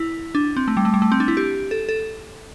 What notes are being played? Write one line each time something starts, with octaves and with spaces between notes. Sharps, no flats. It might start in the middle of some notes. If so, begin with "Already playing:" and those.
Already playing: E4
D4
C4
A3
G3
A3
G3
A3
C4
D4
E4
G4
A4
A4